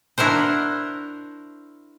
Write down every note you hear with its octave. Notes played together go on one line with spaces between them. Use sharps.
D4 E4 F#4 A#4 C5